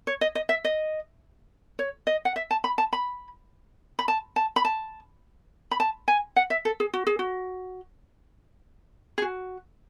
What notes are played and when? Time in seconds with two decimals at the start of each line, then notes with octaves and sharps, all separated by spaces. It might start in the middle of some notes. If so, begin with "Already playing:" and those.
0.07 C#5
0.21 D#5
0.35 D#5
0.49 E5
0.65 D#5
1.79 C#5
2.07 D#5
2.25 F#5
2.36 E5
2.51 A5
2.64 B5
2.78 A5
2.93 B5
3.99 B5
4.08 A5
4.36 A5
4.56 B5
4.65 A5
5.71 B5
5.80 A5
6.08 G#5
6.36 F#5
6.50 E5
6.65 A4
6.80 G#4
6.94 F#4
7.07 G#4
7.19 F#4
9.18 G#4
9.22 F#4